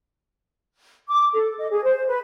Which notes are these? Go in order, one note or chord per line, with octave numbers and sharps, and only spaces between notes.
D6
A4
D#5
G#4
C5
B4